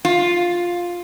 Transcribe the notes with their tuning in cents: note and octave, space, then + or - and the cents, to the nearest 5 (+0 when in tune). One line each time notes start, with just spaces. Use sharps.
F4 +5